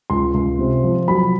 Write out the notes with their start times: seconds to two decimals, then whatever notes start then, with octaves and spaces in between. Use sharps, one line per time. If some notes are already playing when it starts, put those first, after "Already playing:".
0.10 C#2 C6
0.34 C#2
0.59 C3
0.84 F3
1.08 F#3 B5